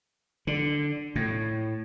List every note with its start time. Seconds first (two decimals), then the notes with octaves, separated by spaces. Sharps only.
0.47 D3
1.16 A2